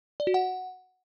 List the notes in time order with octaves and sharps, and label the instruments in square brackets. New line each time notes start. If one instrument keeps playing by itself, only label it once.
[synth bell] D5
F#4
F#5